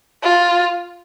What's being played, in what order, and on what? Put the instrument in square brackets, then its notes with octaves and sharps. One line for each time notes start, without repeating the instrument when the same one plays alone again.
[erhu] F4